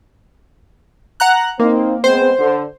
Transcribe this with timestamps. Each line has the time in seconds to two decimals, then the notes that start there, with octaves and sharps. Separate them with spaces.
1.20 F#5 A#5 F#6
1.59 A#3 C4 D#4 C5
2.04 G#3 B3 C4 C5
2.39 D3